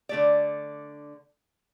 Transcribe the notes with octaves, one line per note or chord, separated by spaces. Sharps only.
D3 A3 D5